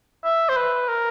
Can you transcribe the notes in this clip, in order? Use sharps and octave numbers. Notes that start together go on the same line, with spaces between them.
E5
C5
B4
A#4